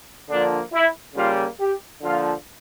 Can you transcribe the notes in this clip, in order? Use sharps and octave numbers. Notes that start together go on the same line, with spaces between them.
D3 F3 A#3 D4
E4
C#3 G3 A#3 F4
G4
D3 F3 A#3 F4